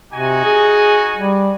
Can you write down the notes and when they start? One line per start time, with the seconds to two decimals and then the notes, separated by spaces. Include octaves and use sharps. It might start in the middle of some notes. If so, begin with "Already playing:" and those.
0.13 C3 D#4 F#4 G#5
0.45 G#4
1.17 G3